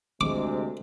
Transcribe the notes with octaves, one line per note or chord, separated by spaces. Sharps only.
D2 C3 G#3 D6